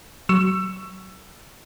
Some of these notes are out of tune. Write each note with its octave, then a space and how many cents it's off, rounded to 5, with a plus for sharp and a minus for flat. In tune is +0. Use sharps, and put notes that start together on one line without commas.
F#3 +25 C#6 +0 E6 +20